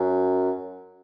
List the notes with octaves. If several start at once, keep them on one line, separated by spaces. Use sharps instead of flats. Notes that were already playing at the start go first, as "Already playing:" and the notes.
Already playing: F#2